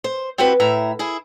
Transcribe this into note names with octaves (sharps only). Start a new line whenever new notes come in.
C5
C4 E4 F#4 G4 B4
A2 E5 A#5
E4 G#4